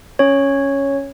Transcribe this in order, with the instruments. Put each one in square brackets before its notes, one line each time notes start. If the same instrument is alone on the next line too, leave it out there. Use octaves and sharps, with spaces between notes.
[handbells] C#4 C#5